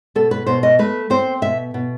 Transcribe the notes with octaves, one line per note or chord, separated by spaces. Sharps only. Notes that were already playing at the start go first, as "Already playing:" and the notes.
B2 A4
B4
B2 C5
D#5
A3 B4
C4 C5
B2 E5
B2